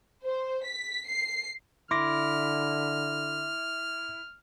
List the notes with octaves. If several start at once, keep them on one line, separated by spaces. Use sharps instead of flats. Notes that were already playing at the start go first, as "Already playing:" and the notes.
C5
B6
C7
D3 E4 C6 D6 F6 A#6